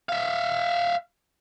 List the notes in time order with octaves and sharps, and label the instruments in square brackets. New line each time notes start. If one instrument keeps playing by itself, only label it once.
[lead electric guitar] E5 F5